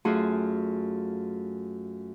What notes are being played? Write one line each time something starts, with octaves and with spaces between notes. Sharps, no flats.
F#2 A3 F4 F#4 G#4 C6